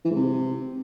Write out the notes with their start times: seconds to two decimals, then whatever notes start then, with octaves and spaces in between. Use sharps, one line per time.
0.05 E3
0.10 G#2
0.16 C3